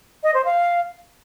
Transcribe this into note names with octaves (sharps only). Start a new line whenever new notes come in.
D#5
C5
F5